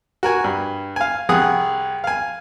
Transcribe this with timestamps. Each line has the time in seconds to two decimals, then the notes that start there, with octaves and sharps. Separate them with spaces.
0.23 F#4 A#4 G#5
0.44 G2
0.96 F5 G#5
1.29 C2 G#4 F#5 D#6
2.04 F5 G#5